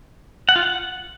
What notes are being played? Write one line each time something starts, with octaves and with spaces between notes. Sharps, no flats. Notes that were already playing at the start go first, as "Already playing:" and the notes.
F#5
F4
F#5